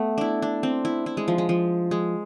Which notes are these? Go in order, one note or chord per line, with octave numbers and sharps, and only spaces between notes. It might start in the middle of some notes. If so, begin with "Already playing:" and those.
Already playing: A3 B3
D4 E4
D4
C4
E4
E4
G#3
F3
G#3
F3
G#3